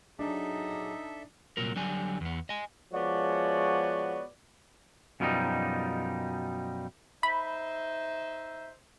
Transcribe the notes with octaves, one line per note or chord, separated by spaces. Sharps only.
F#3 D4 D#4 G#4 A4 E5
C2 A#2 F#3 A#4
D3 F#3 G3 G#5
E2 B3
D#5 G#5
F3 G#3 B3 F#4 C#5 D5
F#2 B2 F3 G3 C#4 D#4
D#4 C5 E5 B5